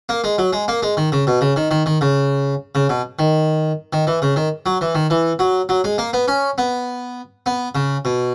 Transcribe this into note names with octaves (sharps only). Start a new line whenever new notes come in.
A#3
G#3
F#3
G#3
A#3
G#3
D#3
C#3
B2
C#3
D#3
D#3
D#3
C#3
C#3
B2
D#3
D#3
E3
C#3
D#3
F#3
E3
D#3
E3
F#3
F#3
G#3
A#3
B3
C#4
B3
B3
C#3
B2